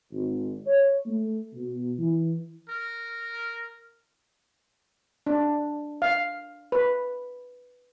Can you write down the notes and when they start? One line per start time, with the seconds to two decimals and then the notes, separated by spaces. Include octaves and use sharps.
0.12 G#1
0.66 C#5
1.07 A3
1.54 B2
1.99 E3
2.69 A#4
5.26 D4
6.02 F5
6.72 B4